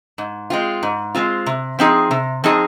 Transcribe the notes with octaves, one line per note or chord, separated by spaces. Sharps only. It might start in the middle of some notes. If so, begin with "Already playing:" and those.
G#2
G#3 C4 F4
G#2
G#3 C4 F4
C3
F3 C4 D#4 G#4
C3
F3 C4 D#4 G#4